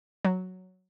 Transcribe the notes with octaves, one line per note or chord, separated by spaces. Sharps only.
F#3